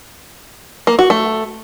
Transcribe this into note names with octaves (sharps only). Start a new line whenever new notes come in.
A#3
F#4
A3